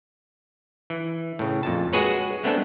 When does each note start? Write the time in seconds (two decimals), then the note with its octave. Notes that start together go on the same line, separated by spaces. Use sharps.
0.90 E3
1.39 A2 C#3
1.63 F2 A#2 A5
1.93 G#3 F#4 G#4 B4 C#5
2.43 G#3 A3 B3 C4 D4 A4